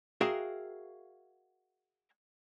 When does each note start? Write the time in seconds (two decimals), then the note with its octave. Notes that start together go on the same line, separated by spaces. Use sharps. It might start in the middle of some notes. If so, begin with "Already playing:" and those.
0.21 F#4 G#4 A#4 E5 F5 G5